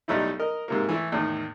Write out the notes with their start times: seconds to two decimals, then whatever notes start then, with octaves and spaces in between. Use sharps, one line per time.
0.08 B1 F#3 G3 A3 D#4 E4
0.40 A#4 D#5
0.68 G#2 C3 A#3
0.89 E3 A3 E4
1.12 E2 A2 D#3